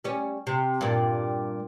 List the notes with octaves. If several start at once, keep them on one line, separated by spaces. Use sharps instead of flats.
G3 C#4
C3
G2 A#2